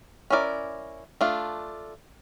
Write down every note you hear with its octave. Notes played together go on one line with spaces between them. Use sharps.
C#4 E4 A#4 D5
A3 D4 F4